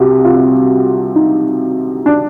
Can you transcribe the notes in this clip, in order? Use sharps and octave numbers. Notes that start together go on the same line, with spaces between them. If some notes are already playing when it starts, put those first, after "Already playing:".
Already playing: C2 C3 F#4
F4
D#4
D4